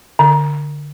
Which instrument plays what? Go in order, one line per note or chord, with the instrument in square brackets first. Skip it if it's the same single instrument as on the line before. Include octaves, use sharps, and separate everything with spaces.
[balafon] D3